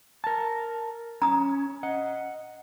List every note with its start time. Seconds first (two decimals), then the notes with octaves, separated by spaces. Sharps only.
0.24 A#4 A5
1.22 C#4 A#5 D#6
1.83 D#5 F#5